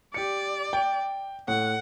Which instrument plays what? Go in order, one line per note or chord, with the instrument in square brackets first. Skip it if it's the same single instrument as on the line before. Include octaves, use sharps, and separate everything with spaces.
[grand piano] G4 C#7 [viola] D5
[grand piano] G5
[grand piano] A2 [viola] F#5